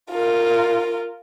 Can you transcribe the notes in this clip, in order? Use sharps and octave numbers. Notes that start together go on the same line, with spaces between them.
F4 A#4